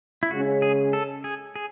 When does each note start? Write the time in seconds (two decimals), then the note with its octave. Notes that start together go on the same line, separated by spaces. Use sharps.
0.23 E4
0.31 C#3 G#3 C#4 F#4
0.62 G#4
0.93 A4
1.24 G#4
1.56 G#4